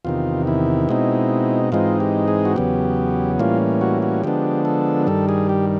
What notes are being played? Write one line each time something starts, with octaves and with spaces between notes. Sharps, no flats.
E2 C3 D#3 F4
E4
B2 G#3 C4 D#4
G#2 E3 G#3 C4 D#4 F4
G4
G#4
F#4
E2 C#3 F#3 B3 G4
A2 E3 G3 A#3 C#4 F4
F#4
F#4
D3 F3 G#3 B3 D4 G4
A4
G2 D#3 G3 A4
G#4
G4